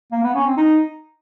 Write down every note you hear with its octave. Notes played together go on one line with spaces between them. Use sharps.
A#3
B3
C#4
C4
D#4